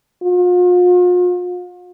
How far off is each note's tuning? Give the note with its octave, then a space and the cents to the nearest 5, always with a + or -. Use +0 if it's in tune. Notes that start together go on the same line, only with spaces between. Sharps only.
F4 +40